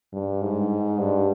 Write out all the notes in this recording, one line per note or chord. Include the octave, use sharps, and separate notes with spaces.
G2
G#2
G2